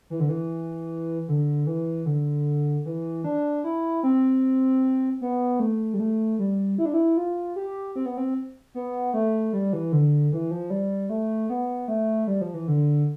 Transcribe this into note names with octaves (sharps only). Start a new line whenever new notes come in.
E3
D3
E3
D3
E3
D3
E3
D4
E4
C4
B3
A3
G3
A3
G3
E4
D4
E4
F4
G4
C4
B3
C4
B3
A3
G3
E3
D3
E3
F3
G3
A3
B3
A3
G3
F3
E3
D3